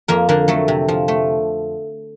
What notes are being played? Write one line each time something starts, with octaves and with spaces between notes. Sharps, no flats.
F2 A#3 A#4
D3 A#3 A#4
F#3 A3 A4
C3
F3
A3